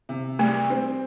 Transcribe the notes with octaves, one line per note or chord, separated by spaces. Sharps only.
C3
G3 A3
C4